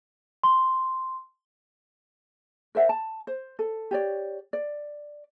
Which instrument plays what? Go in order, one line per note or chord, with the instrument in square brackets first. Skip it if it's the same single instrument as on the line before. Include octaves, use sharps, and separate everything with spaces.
[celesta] C6
[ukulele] A#4 C5 E5 F#5
A5
C5
A4
G4 C#5 D5
D5